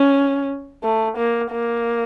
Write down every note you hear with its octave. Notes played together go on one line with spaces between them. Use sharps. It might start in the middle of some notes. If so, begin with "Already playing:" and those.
Already playing: C#4
A3
A#3
A#3